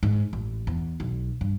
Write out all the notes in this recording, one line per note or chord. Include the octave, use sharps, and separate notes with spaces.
G#2
A1
E2
B1
G2